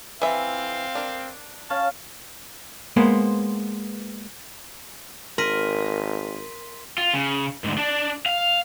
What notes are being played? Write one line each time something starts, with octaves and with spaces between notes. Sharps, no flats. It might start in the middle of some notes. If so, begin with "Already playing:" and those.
E3 C4 E5 F5
D4 A#4
C#4 F5 A5
G#3 A#3 B3 B4 C5
G#1 A#4 C6 B6 D#7
F4
C#3
D2 G#2
D4 D5
F5